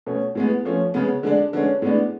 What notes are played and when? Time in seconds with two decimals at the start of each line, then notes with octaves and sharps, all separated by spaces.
0.06 B2 A3 C#4
0.35 A2 G#3 B3
0.65 F3 A3 C#4
0.94 C#3 G#3 B3
1.23 D3 G#3 D4
1.53 D3 G#3 C#4
1.82 A2 G#3 B3 D4